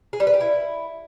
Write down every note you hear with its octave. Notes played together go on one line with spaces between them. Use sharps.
G#4
G3
B4
G4
E4